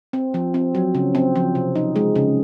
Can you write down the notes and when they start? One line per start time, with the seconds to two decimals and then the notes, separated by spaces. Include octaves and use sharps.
0.13 C4
0.34 F3
0.54 C4
0.75 F#3
0.95 C#3
1.15 C4
1.36 F3
1.55 C3
1.76 D#4
1.96 G#3
2.15 C#3